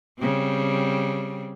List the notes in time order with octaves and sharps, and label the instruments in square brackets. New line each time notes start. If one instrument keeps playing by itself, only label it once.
[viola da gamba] C#3 G3 C4